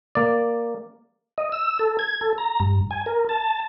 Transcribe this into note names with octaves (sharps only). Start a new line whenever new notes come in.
A#3 D5
D#5
E6
A4
G#6
A4
A#5
G2
G#5
A#4
A5